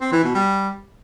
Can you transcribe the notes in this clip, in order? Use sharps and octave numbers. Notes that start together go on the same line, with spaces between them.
C4
E3
B2
G3